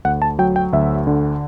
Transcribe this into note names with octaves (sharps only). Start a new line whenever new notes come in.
D2 F#5
A5
F#3 G5
G5
D2 E5
D3